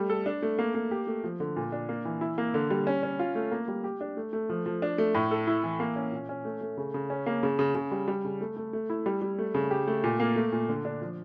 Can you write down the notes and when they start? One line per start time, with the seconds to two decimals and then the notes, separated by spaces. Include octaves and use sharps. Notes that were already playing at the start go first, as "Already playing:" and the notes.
Already playing: G3 A3
0.10 A4
0.26 D4
0.42 A3
0.59 A#3
0.75 A#3
0.91 G4
1.07 A3
1.24 F3
1.40 D3
1.56 A#2
1.72 D4
1.89 A#3
2.05 E3
2.21 E4
2.38 A#3
2.54 D3
2.70 G3
2.87 C#4
3.03 C#4
3.19 F4
3.35 A3
3.51 A#3
3.68 G3
3.84 G4
4.01 D4
4.17 A3
4.33 A3
4.49 F3
4.66 F3
4.82 D4
4.98 A3
5.15 A2
5.31 A4
5.47 E4
5.64 E3
5.80 A#3
5.96 C#4
6.12 A#2
6.29 C#4
6.45 A3
6.61 A3
6.77 C#3
6.94 C#3
7.10 C#4
7.26 A#3
7.43 C#3
7.59 C#3
7.75 C#3
7.92 G3
8.08 G3
8.24 C#3
8.41 A3
8.57 A3
8.73 A3
8.90 E4
9.06 G3
9.22 G3
9.39 A3
9.54 C#3
9.71 G4
9.87 A3
10.04 A#2
10.20 A#3
10.36 A3
10.52 A#2
10.69 D3
10.85 D4
11.02 F3